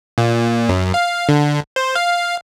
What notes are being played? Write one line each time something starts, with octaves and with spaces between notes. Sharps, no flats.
A#2
F#2
F5
D3
C5
F5